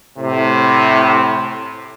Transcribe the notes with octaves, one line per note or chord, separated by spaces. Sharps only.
A2 C3